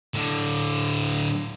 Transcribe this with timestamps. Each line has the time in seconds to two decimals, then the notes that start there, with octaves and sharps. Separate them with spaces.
0.15 A2 D3